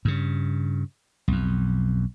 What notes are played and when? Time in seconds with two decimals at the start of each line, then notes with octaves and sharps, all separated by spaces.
0.05 G2 C#3
1.28 B1 F2